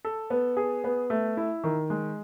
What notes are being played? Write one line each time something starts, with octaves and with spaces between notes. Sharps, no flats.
A4
B3
G#4
B3
A3
E4
D#3
G#3